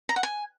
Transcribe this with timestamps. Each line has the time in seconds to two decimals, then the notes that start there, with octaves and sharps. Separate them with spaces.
0.09 A#5
0.16 F#5
0.23 G#5